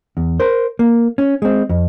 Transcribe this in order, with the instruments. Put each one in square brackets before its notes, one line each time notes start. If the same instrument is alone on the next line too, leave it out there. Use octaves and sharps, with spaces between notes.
[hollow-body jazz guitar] E2
A#4 C5
A#3
C#4
G#3 C4
F2